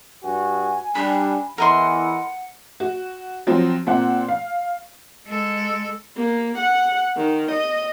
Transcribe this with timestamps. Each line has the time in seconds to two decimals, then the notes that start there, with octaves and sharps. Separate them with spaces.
0.23 G2 F#4 G#5
0.95 G3 D4 B5
1.58 E2 E3 A#4 D#5 F#5 B5 C6
2.80 F#4
3.47 F3 F#3 C4
3.87 A#2 C4 F#5
4.28 F5
5.26 G#3 A4
6.17 A#3
6.58 F#5
7.17 D#3
7.51 D#5